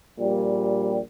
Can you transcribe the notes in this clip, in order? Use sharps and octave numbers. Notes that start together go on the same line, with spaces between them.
A#1 A#2 G3